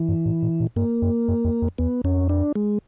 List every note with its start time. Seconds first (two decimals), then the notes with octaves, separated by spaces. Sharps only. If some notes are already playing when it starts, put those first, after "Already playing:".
Already playing: E3
0.09 G2
0.26 A2
0.43 A#2
0.60 A#2
0.76 G2 A#3
1.02 F#2
1.28 F#2
1.45 F2
1.62 F2
1.78 E2 B3
2.04 F2 C#4
2.29 D4
2.56 G#3